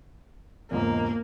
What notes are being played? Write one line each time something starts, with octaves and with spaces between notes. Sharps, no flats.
E1 C#2 G#2 A#3